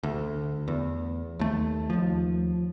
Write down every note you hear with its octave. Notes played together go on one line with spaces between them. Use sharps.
D2
E2
D#2 A3
D#2 F3